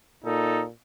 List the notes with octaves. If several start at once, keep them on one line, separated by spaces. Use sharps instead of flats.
A#2 D#4 A4